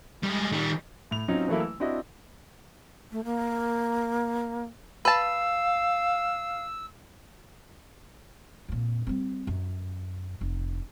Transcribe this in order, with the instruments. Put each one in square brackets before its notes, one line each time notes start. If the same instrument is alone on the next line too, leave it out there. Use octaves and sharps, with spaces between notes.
[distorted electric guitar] G3 G#3
D#3 G3
[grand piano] A2 F7
F#3 C4 C#4 D#4 F4
E3 F#3 A3 A#3 E4
E6
C4 D4 E4 F#4 D#5
[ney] A3
A#3
[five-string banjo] B4 A5 [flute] F5 [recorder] E6
[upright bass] F2 A#2
G3 C4
F#2
F1